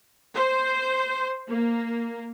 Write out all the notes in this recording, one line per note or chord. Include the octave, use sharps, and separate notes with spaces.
C5
A#3